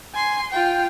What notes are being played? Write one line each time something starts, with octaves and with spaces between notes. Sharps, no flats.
G#5 C6
F4 G5